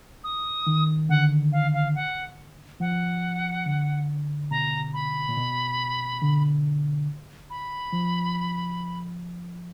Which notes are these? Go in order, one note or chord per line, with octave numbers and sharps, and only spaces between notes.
D#6
D#3
D3 F#5
F5
F5
F#5
F3 F#5
D3
B2 A#5
B5
A#2
B2
D3
B5
F3